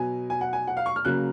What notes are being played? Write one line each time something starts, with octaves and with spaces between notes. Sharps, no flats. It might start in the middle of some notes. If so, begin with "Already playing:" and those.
Already playing: B2 F#3 B3 G#5
G#5
F#5
G#5
F#5
F5
C#6
F6
C#3 F#3 A#3 F#6